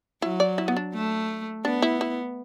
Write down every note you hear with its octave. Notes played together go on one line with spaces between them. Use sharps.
F#3 E4
D5
E4
B3
D4
A3
B3 D4
E4
E4